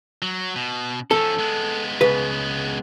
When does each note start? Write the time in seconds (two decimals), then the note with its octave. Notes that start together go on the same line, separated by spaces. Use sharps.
0.22 F#3
0.56 B2
1.11 F3 C#4 A4
1.39 G#3 B3
2.01 C#2 B4